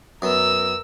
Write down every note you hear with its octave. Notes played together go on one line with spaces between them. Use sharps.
F#2 B3 A#4 E6